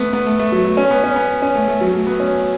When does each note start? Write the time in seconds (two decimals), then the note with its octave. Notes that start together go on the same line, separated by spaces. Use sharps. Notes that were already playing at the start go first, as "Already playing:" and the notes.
Already playing: A3 B3
0.13 B3
0.26 A3
0.39 A3
0.52 F#3
0.65 A3
0.77 C#4
0.91 B3
1.04 C#4
1.16 B3
1.42 C#4
1.55 A3
1.68 A3
1.81 F#3
1.94 A3
2.07 B3
2.20 C#4